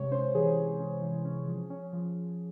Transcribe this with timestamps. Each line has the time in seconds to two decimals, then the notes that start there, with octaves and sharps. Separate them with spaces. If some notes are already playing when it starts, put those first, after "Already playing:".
Already playing: C3 G#3 C#5
0.11 C#4 C5
0.35 E3 G#4
0.57 E3
0.79 C#4
1.02 E3
1.25 C#4
1.47 F3
1.70 C#4
1.93 F3